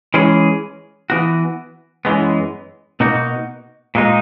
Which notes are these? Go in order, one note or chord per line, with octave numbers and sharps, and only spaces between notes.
E3 G#3 C#4 G#4
E3 B3 F#4
F#2 E3 G#3 B3
B2 A#3 D#4 F#4
A#2 G#3 D#4